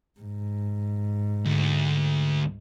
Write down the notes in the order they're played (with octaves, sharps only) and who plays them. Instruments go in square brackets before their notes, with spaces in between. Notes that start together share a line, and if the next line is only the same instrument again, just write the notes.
[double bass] G#2
[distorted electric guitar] D2